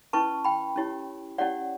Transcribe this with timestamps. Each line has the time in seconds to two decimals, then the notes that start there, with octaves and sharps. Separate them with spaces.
0.13 C#4 E4 B4 A5 C#6
0.44 G5 B5
0.76 C#4 E4 G4 C#5
1.38 C#4 E4 G4 C#5 D5 F#5